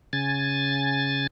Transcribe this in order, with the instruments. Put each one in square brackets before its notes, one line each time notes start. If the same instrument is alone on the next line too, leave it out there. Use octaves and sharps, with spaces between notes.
[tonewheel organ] C#3 G#5 A6